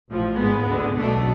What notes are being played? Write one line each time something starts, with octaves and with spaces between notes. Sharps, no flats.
A1 A2 F3
G#1 G#2 G#3 B3
D2 D3 G#3
B1 B2 A3 D4